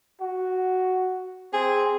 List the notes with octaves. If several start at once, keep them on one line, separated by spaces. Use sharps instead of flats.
F#4
C4 G#4